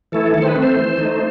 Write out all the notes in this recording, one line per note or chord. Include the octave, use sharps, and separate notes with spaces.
E3 A3 E4 A4
D#3 A4
C5
B4
A3 C4
C5
E3
A3 D#4